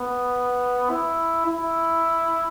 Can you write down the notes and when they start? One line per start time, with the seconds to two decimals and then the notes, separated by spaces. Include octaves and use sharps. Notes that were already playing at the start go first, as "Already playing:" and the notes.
Already playing: B3
0.90 E4
1.46 E4